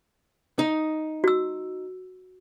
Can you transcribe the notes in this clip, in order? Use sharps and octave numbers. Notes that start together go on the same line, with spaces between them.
D#4
F#4 E6